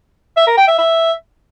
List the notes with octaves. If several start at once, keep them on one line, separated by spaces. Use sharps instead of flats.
E5
A#4
G5
E5
E5